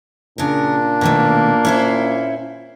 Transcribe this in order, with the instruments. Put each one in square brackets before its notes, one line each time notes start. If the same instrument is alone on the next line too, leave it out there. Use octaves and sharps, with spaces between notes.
[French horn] A#2 [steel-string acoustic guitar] C#3 A#4 [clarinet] D4
[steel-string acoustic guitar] B2 D#3 A3 [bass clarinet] A#3
[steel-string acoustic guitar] C#4 E4 C5